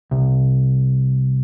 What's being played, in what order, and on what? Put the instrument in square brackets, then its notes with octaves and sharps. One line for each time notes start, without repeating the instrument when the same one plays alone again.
[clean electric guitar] C2